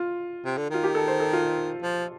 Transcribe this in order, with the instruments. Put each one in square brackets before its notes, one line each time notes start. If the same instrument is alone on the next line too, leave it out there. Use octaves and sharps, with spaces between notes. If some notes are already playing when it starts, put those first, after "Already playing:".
Already playing: [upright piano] F4
[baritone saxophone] C3
D3
[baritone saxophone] D#3 [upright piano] F4
[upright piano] G4
A4
C5
A4
F4
[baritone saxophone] F3